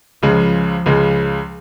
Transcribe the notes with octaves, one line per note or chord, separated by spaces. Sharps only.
C#2 C#3 F3 G#3
C#2 C#3 G#3